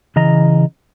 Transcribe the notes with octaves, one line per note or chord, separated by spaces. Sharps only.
C#3 E3 D#5 A#5